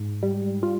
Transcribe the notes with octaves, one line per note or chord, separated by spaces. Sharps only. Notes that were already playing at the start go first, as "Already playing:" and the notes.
Already playing: G#2
G3
F4